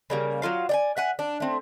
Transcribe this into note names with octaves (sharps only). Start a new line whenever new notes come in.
C#3 G3 A#3
F#3 E4 F4 F5
D5 G5 G#5
E5 F#5 G#5
D4
A3 C4